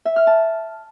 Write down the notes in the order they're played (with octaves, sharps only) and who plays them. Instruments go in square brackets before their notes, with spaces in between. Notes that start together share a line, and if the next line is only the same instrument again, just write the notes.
[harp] E5
F6
A5